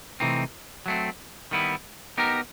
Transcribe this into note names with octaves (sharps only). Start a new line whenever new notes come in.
C3 E3 A3 C4 D#4
F#3 A3 C4
D#3 G3 B3 E4
B3 D#4 G4 A#4